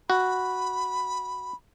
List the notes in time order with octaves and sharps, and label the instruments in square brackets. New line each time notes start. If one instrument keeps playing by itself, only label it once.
[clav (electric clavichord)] F#4 [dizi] B5